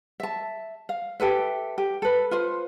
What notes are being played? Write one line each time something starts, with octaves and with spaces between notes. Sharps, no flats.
E5 A5
F5
G4 A4 B4 E5
G4
A4 B4
F4 B4 C5